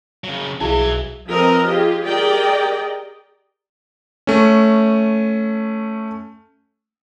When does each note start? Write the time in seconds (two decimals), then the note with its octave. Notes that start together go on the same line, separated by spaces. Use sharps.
0.24 C#3 F#3
0.61 B1 E4 F#4 G#4 E5 F5 G#5
1.27 F3 C4 A#4 B4 D#5
1.67 F4 G4 G#4
2.04 G4 G#4 A#4 D5 D#5 G5
4.27 A3 C#4